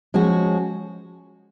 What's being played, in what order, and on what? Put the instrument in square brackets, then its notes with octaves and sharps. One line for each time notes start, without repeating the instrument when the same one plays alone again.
[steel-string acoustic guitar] F3 G#3 C#4 F#4